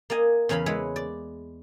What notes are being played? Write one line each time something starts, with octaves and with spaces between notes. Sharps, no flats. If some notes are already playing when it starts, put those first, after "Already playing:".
A#3 D5 D#5 G#5
E2 C#3 C#4 F5 B5
G#3 E4 B4 C#5
D5